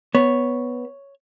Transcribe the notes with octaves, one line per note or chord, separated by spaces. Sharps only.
B3 C#5